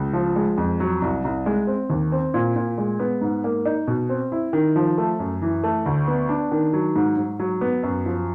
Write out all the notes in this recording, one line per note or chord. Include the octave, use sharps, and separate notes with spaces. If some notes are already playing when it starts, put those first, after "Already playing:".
Already playing: C#2
F3
G#3
F2
F#3
C2
C2
G#3
C4
D#2
C4
A#2
A#2
G#3
B3
G#2
A#3
D#4
B2
C4
E4
D#3
F3
A3
F#2
E3
A3
D2
B3
D4
D#3
F#3
G#2
G#2
F#3
B3
F#2
F3